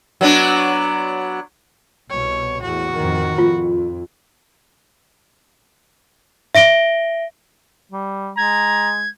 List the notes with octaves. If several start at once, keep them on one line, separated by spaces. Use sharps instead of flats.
F#3 B3 D4
C2 B2 C#5
E2 A2 F#4
F2 A2 D#3
F2 F4
E5 A#6 D7 G7
G3
G#3 A#5 G#6